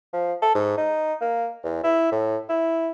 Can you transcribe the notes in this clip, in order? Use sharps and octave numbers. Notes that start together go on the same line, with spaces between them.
F3
A4
G#2
D#4
A#3
E2
E4
A2
E4